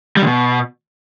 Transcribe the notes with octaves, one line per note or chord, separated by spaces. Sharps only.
G3
D3
B2